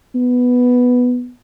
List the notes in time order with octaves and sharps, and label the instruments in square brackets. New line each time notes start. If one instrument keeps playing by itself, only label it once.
[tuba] B3